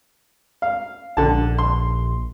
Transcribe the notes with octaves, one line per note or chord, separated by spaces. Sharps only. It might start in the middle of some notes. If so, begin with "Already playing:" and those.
F5
A#1 D3 A5
C6